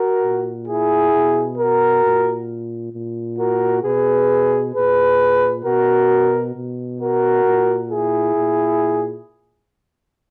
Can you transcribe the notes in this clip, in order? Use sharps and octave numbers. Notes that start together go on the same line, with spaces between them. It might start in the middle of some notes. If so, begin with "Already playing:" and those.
Already playing: F#4 A#4
A#2
E4 G#4
B2
F#4 A#4
A#2
A#2
F#4 A#4
B2 G#4 B4
A#2 G#4 B4
B2 F#4 A#4
B2
F#4 A#4
A#2
E4 G#4
A#2